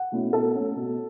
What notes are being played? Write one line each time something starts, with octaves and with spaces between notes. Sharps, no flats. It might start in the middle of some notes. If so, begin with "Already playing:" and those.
Already playing: F#5
B2 A3 C#4 E4
B2 A4
A3 C#4
B2